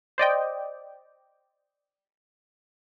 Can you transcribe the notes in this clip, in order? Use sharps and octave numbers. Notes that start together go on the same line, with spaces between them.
C5 D5 D#5 G5